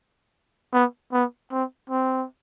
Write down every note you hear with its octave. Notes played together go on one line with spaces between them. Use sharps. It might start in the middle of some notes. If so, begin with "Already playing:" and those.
B3
B3
C4
C4